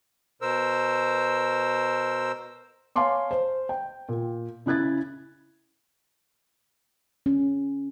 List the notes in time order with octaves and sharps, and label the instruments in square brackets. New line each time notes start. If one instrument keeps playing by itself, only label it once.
[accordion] B2 A#4 C5 E6
[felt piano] C#5 F5 G#5 A5 C6 D6
C5
G5
A#2
C#3 E4 F#6 G#6 A6
[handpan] C#4